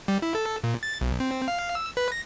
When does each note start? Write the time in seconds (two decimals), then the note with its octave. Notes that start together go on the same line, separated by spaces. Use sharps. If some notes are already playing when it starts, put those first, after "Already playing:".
0.08 G3
0.22 E4
0.35 A4
0.64 A#2
0.83 A6
1.01 B1
1.20 C4
1.48 F5
1.75 E6
1.97 B4
2.12 A#6